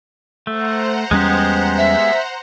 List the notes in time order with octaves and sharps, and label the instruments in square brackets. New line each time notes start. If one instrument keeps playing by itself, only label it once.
[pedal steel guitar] A3 [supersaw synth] C5 F#5 A#5
[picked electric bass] E2 G3 C#4 [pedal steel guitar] G#3 B3 G4
[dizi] E5